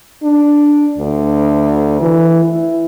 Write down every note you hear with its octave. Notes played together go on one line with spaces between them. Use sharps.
D4
D2
E3
E4